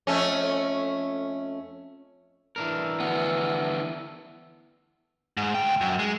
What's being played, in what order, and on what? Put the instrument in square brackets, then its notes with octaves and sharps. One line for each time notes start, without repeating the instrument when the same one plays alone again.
[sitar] F2 A3 C#4
[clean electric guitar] E3 D4 A#4
[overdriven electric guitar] D2 B3
[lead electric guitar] G#2
D2 G5
F#2
G#3